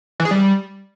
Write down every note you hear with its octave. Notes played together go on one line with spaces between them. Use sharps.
E3
G#4
G3